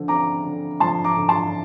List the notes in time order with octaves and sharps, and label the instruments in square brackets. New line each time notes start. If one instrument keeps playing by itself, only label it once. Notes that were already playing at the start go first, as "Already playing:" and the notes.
Already playing: [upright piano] D3 F3
C4 A#5 D6
D3
F3 A5 C6
A#5 D6
D3
A5 C6